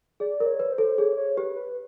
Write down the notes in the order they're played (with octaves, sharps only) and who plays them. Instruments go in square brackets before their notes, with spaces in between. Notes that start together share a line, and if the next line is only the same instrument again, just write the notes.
[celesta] G#4 [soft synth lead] D5
[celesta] A#4
[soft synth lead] C#5
[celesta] B4
[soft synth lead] C5
[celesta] A4
[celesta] G#4 [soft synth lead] C#5
[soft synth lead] C#5
[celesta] G4 [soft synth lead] B4
[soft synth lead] B4